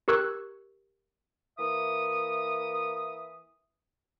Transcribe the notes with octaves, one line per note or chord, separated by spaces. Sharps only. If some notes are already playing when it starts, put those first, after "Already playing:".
G4 A#4 C#6 E6 F#6 G#6
E3 A#3 E5 D#6